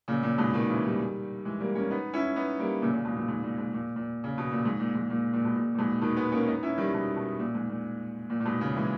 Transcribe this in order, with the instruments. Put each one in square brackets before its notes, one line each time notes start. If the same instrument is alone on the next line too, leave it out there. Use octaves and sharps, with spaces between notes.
[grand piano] A#2 C#3
A#2 C#3
G#2 B2
B2 D#3
C#3 E3
D#3 G3
E3 G#3
G3 A#3
A#3 C#4
B3 D#4
C#4 E4
B3 D#4
G3 A#3
A#2 C#3
A#2 C#3
G#2 B2
A#2
G#2
A#2
G#2
A#2
A#2
C#3
B2
A#2
G#2
A#2
G#2
A#2
A#2
G#2 B2
A#2
A#2
G#2 B2
B2 D#3
G#3 B3
A#3 C#4
B3 D#4
C#4 E4
D#3 G3
B2 D#3
B2 D#3
A#2
G#2
A#2
A#2
A#2
G#2 B2
A#2 C#3
E3 G#3